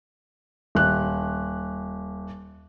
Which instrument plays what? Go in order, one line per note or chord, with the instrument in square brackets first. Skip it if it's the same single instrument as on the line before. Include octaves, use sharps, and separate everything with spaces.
[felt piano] D#1 F#6